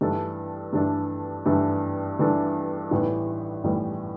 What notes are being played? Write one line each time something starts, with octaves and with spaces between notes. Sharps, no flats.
G2 E3 A3 D4 A4
G2 E3 A3 D4 A4
G2 E3 A3 D4 A4
G2 E3 A3 D4 A4
A1 A2 E3 G3 B3
A1 A2 E3 G3 B3